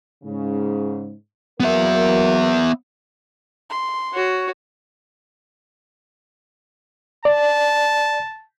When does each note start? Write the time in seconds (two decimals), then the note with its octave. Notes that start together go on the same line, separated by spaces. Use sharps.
0.24 G#2 C#3
1.60 F#3 A#3 B3 A#4 E5
3.70 C6
4.14 F#4 C#5
7.25 D5 A5